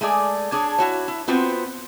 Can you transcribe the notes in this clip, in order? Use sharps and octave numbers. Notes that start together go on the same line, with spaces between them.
G#3 A3 G#4 D5
D4 G#4 C#5
E4 F#4 C#5
E4
B3 C4 F4 F#4 C5